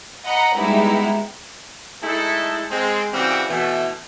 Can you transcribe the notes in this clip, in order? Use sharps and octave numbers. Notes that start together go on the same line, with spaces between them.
D#5 F#5 A#5 B5
G3 G#3 B3 D#4 E4 G4
G#3 A3 D#4 E4 A4
G#3 C4
C#3 E3 G3 C4 F#4 G4
B2 E3 A3